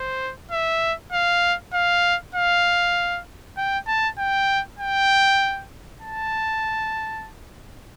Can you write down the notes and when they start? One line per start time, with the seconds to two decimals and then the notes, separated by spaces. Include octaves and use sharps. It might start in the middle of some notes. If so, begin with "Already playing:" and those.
Already playing: C5
0.51 E5
1.12 F5
1.74 F5
2.35 F5
3.57 G5
3.87 A5
4.18 G5
4.79 G5
6.01 A5